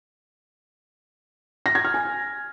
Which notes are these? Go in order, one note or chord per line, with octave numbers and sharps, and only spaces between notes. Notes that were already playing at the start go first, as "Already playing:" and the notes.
A#6
G#6
F6
G#5